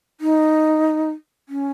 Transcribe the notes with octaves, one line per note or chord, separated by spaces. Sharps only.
D#4
C#4